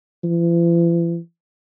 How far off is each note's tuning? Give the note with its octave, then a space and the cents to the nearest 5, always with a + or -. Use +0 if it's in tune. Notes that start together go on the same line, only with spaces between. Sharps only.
E3 +45